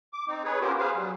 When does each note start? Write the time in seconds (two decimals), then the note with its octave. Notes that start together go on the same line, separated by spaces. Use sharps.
0.13 D6
0.28 C4 D#4
0.44 G#4 B4 C#5
0.61 B3 C#4 F4 G4 A#4 C5
0.78 G#4 B4 C5 F5
0.96 F#3 G3